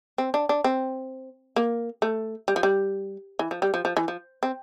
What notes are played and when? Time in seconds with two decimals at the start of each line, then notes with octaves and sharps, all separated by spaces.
0.18 C4
0.34 D4
0.49 D4
0.64 C4
1.56 A#3
2.02 A3
2.48 G3
2.56 F3
2.63 G3
3.39 E3
3.51 F3
3.62 G3
3.74 F3
3.85 F3
3.97 E3
4.08 F3
4.43 C4